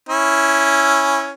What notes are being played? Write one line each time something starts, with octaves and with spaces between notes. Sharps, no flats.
C#4 E4